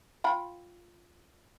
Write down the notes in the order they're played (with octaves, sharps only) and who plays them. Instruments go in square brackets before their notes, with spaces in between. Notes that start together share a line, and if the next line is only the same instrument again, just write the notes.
[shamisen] F4 G5 B5